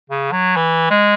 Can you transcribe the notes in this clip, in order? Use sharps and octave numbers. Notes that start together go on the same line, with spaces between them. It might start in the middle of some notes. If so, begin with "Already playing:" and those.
C#3
F#3
E3
G#3